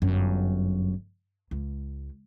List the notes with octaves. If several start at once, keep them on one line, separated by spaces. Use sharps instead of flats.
G1 F#2
C#2